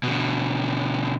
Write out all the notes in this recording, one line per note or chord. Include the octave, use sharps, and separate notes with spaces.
B2 D3